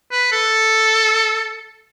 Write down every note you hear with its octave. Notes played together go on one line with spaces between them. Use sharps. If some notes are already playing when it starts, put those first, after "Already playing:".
B4
A4